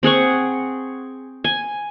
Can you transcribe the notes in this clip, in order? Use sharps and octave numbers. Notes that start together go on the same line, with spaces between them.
C4 G#4 F#5 C#6
G#5